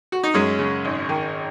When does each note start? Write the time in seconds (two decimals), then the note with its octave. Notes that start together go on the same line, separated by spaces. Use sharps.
0.12 F#4
0.23 D#4
0.34 F#2 G#3 C#4
0.59 C#3
0.85 G#1
1.09 D#3